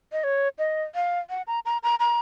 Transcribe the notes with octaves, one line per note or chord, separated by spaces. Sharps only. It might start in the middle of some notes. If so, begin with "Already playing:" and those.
D#5
C#5
D#5
F5
F#5
A#5
A#5
A#5
A#5